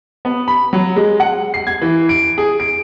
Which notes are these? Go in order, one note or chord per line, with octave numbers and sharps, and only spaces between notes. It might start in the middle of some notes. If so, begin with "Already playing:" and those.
B3
B5
F#3
G#3
F#5
C7
G#6
E3
D7
G#4
D7